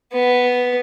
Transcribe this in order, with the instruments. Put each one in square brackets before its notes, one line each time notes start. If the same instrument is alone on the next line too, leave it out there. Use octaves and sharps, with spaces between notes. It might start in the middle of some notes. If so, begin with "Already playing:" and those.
[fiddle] B3